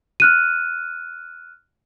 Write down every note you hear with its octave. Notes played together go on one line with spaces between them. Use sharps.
F6 F#6 D#7